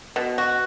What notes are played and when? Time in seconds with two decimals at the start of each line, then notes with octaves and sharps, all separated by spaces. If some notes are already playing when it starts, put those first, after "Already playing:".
0.16 B2
0.38 F#4